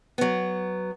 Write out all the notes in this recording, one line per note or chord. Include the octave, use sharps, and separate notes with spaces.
F#3 B3